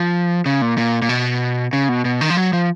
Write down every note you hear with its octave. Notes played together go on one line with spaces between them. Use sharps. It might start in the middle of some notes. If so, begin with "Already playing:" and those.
Already playing: F3
C#3
A#2
A#2
A#2
B2
C#3
B2
B2
D#3
F3
F#3
F3